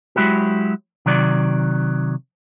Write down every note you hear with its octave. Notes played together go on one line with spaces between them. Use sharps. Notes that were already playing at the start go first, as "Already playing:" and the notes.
F#3 G#3 E4 F#4 G4
C3 D#3 F#3 D5